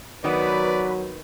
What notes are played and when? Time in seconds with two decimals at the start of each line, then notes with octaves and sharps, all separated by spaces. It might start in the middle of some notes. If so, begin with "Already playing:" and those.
0.24 D#3 F#3 B3 B4 D5